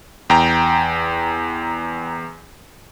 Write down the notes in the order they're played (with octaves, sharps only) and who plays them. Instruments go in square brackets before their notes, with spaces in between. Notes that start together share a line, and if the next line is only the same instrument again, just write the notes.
[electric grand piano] E2 G5 A#5